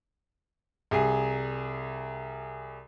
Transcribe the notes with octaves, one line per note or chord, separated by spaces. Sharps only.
C2 G#4 G#5